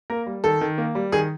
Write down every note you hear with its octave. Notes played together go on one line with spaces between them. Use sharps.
A#3 A#4
G3
D#3 A4
D#3
A#3
G3
D#3 G#4